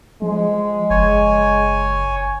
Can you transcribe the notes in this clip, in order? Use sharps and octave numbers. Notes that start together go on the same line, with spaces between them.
F3 G#3
F#1 C#5 G#5